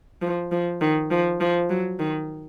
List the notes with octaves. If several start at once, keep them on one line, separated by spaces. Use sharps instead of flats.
F3
F3
D#3
F3
F3
F#3
D#3